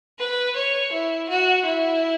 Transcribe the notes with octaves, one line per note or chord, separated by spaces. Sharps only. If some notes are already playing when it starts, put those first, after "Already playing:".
B4
C#5
E4
F#4
E4